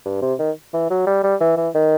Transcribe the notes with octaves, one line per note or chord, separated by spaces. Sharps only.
G2
C3
D#3
E3
F#3
G3
G3
E3
E3
D#3